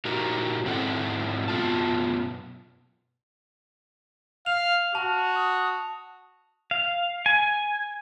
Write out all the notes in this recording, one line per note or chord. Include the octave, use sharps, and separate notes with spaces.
A#2 D#4 F#4 G4 A#4
G#2 C4 E4 A4 F#5
F#2 B2 B3 F4 A5
F5 F6 F7
F#4 A5
D#6
F5
G#5